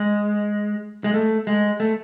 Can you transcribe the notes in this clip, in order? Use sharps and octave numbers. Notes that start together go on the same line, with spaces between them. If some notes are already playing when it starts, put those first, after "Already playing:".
Already playing: G#3
G#3
A3
G#3
A3